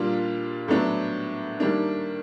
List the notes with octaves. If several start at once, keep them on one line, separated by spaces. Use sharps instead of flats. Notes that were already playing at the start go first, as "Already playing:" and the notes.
Already playing: A#2 G3 A#3 D4 F4
A2 F#3 B3 D4
D#3 G3 A#3 D4